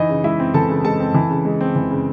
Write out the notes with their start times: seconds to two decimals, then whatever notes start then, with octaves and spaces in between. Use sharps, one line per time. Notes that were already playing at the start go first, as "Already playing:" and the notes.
Already playing: E3 D#4 D#5
0.09 C#3
0.24 G#3 E4 E5
0.39 C4
0.54 E3 A4 A5
0.69 C#3
0.84 G#3 A4 A5
1.00 C4
1.14 E3
1.30 C#3
1.45 G#3
1.61 C4
1.75 E3
1.91 C#3